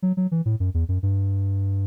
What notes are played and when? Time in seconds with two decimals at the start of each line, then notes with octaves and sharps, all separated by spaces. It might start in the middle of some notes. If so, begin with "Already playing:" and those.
0.02 F#3
0.17 F#3
0.31 E3
0.46 A2
0.60 F#2
0.74 E2
0.89 F#2
1.03 G2